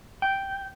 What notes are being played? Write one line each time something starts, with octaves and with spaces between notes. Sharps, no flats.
G5